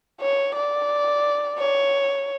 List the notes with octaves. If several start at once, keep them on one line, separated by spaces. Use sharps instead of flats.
C#5
D5
C#5